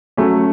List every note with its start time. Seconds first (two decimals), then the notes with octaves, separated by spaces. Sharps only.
0.17 F#3 A3 C#4